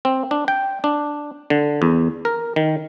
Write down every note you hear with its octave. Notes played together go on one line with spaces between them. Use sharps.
C4
D4
G5
D4
D3
E2
A#4
D#3